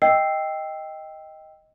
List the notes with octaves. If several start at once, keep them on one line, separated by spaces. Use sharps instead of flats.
D#5 G5 E6 C7